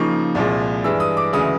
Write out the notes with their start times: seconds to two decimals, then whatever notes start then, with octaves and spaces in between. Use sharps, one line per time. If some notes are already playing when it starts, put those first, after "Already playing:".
Already playing: C#3 F3 A#3 D#4 C#6
0.35 C2 A#2 F3 G#3
0.84 G2 E3 G#3 E6
1.00 D#6
1.17 D6
1.33 D2 C#3 E3 G#3 D#6